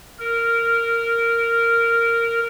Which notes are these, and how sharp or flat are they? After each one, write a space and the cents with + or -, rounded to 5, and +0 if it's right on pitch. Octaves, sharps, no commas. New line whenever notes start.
A#4 -10